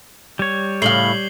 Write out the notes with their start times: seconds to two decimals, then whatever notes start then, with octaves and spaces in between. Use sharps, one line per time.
0.39 G3 C#5
0.82 A2 C#3 F5 C7 F#7 G7